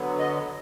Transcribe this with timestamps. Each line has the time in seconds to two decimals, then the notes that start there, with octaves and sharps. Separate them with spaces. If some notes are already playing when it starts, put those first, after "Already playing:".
Already playing: D3 F#3 B3
0.18 D#5